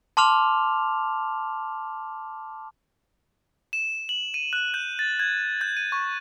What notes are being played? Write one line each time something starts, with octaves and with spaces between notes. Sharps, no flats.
A5 C6 D6 F6 F7
E7
F#7
D#7
F#6
G6
A6
G#6
G6
D#7
C#6